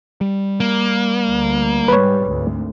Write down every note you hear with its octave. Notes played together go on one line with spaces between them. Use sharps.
G3
A#3
D2
G#2 G3 B4 C#5
G#1 D2